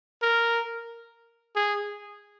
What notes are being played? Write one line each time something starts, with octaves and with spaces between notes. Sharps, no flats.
A#4
G#4